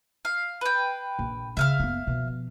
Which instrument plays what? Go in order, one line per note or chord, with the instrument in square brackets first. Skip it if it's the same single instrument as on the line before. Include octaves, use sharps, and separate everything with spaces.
[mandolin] F5
B4 G5
[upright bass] A#1
[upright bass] C#3 [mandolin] E5 F5 F6
[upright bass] F#1 B3
B2 F3